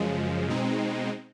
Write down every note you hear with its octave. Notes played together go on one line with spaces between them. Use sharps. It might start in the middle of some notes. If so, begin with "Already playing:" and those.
Already playing: F#2 C#3 F3 G#3
B2 G#3 C4 D#4